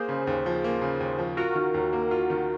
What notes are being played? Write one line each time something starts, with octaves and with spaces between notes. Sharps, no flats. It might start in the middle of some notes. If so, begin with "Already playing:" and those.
Already playing: A#3 G#4 C5
C#3
D#2
F3
A#3
C#3
D#2
F3
F4 F#4 A#4
D#3
D#2
A#3
F4
D#3